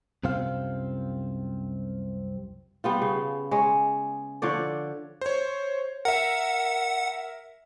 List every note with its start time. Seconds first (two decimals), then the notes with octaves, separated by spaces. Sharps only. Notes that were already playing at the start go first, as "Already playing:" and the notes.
0.23 C2 F#2 C3 C4 F4 F5
2.84 G3 B3 F4
3.02 C#3
3.51 G#3 C#5
4.42 D3 F3 C#5 D5
5.21 C5 C#5
6.05 A#4 E5 F#5